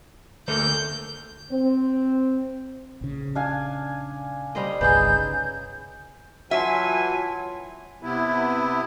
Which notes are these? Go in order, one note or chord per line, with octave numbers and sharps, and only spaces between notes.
D2 A3 A#3 G6
C4
A#1 C#3
D4 F5 G#5
G3 C5 D#5
G1 C2 C#3 D#4 G#4 B4 E6 G6
E3 F#3 F4 E5 G#5 A5 C6
C3 B3 E4